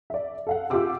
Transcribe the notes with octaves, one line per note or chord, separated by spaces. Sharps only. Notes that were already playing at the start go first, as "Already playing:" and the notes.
D5 E5
A4 F5 F#5
F4 G4 G#4 F#5 D6 E6